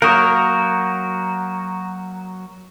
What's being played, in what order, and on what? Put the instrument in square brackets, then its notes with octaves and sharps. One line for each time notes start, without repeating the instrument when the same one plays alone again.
[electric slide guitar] F#3 F#4 A#4 [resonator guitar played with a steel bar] A#3 [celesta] C#6 D#6 G6